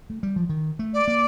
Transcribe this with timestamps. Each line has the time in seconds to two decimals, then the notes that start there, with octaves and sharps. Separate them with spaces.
0.10 A3
0.23 G3
0.36 F3
0.49 D#3
0.79 A3
0.94 D5
1.08 A#3